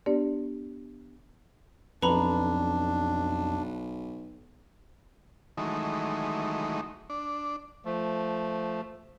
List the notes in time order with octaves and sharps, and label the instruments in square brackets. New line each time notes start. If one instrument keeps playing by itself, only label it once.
[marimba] B3 D4 G4 D5
[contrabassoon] B1 [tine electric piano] F2 [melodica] D4 [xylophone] B4 A#5 B5
[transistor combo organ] D#3 E3 F#3 G#3 A3 D#4
D4
[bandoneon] F3 A3